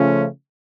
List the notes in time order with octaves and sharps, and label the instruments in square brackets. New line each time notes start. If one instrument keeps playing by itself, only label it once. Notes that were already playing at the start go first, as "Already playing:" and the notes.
Already playing: [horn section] C#3 F3 A3 C#4 F4